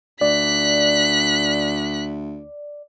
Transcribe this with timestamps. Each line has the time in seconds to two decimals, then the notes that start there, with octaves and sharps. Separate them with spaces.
0.21 D2 D5 F#6 B6